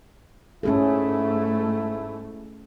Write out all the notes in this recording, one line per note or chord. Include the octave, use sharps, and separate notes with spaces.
G#2 A3 C#4 E4 G#4 A4